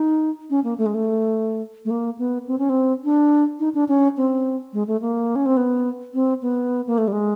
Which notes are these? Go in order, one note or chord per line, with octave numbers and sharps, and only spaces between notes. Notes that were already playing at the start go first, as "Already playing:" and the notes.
Already playing: D#4
C#4
A#3
A3
G#3
A3
A3
A#3
B3
C4
C#4
C4
D4
D#4
D4
C#4
C4
G#3
A3
A#3
C#4
C4
B3
C4
B3
A#3
A3
G3
G#3